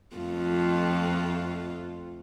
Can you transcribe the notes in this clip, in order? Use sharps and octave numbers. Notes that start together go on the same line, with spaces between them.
F2 A3 F4